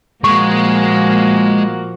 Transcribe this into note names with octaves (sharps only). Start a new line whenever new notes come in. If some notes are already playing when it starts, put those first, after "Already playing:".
A#2 F3 G#3 A#3 F#4 C#6